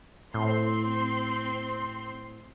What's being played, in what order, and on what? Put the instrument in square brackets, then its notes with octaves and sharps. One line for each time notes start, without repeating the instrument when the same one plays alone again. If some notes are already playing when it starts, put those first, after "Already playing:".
[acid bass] A2 [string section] C4 C6